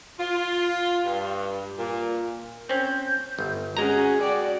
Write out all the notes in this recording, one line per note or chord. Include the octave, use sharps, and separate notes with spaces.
F4
G2
A#2
C4 C#4 G6
G1
G#3 C#4 F#4 G#4 A#5
F#4 D5 G5